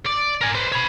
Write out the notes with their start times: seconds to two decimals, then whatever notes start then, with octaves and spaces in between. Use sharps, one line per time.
0.06 D5
0.41 A#4 G#5
0.55 B4 C5
0.72 C#5 B5